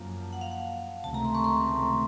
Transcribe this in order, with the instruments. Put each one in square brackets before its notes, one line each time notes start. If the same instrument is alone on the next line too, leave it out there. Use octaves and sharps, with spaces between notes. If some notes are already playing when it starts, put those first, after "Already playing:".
Already playing: [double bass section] F#2 F3 A#3
[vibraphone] A5
F#5
F5
F#5
[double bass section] C#2 C3 D#3 A3 C4 [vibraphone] A5
[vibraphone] A#5
C6
C#6
C6